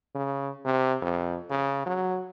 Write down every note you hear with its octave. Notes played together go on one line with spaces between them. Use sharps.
C#3
C3
F2
C#3
F#3